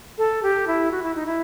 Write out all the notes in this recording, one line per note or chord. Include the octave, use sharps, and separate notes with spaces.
A4
G4
E4
F#4
E4
D#4
E4